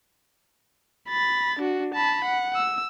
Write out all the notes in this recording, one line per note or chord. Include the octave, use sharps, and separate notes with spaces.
B5 A6
D4 F#4
A5 B5
F#5
E6